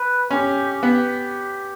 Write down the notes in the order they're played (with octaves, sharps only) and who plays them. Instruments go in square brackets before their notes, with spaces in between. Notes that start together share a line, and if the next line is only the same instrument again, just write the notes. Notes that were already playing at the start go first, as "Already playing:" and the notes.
Already playing: [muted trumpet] B4
[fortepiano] C#4 [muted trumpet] G4
[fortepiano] B3 [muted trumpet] G4